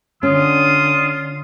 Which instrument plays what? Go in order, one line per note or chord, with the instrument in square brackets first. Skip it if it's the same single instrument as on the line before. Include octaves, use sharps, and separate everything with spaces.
[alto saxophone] D3 [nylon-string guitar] C#4 [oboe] F4 [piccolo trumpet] D#6